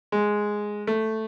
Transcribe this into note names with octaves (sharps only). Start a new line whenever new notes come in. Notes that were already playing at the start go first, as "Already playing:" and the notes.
G#3
A3